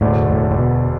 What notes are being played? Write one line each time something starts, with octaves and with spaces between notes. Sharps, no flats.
E1 D2 A2 D3 A3 D4
A2
A2
B2